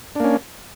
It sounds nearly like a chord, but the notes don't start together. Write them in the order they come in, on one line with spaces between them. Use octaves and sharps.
D4 A#3 C#4